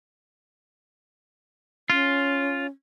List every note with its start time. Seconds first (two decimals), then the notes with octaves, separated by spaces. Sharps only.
1.90 C#4 F4